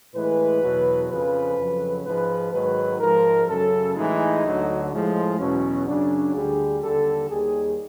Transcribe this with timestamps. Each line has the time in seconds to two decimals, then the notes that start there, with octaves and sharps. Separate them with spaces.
0.14 A2 E3 G#3 B4
0.62 E2 B2 F#3
1.09 F2 C#3 F3 B4
1.57 F2 C#3 F#3
2.05 G#2 F3 G#3 B4
2.53 G#2 D#3 F#3 B4
3.00 G#2 F3 G#3 A#4
3.48 F#2 C#3 F#3 A4
3.96 A2 E3 G#3 D#4
4.43 D2 D3 F#3
4.91 A2 F3 G#3
5.39 E2 B2 F#3 C#4
5.86 F#2 C#3 F#3 D4
6.34 D2 D3 G3 G#4
6.82 D#2 D3 G3 A4
7.29 D#2 D#3 G3 G#4